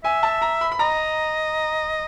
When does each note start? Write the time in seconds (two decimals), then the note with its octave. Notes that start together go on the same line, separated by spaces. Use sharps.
0.04 E5 G#5
0.23 A5
0.42 A#5
0.61 B5
0.72 B5
0.79 D#5 A#5